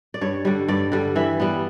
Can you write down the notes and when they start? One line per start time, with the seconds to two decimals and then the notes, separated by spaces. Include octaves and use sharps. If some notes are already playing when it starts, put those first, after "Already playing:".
0.14 D5
0.21 G2 C#5
0.45 D3 G3
0.68 G2 D5
0.92 D3 G3
1.16 E3 E5
1.40 G3 B3